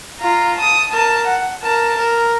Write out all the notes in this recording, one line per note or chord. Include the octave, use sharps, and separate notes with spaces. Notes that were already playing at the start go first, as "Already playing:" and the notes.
F4 A#5
A5 D#6
A#4 A5
F#5
A#4 A5
A#4